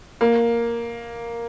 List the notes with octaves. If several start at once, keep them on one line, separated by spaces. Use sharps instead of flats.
A#3